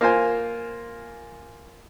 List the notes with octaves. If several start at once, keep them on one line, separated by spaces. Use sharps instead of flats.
A#3 F4 C5 G#5